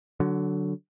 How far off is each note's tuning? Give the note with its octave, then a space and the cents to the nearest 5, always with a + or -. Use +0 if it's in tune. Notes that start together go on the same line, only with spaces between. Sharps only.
D3 +0 F#3 +15